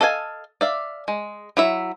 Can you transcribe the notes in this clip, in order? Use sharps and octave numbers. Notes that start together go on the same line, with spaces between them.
A4 D#5 F5 F#5 G#5
D5 E5 F5
G#3
F#3 E4 E5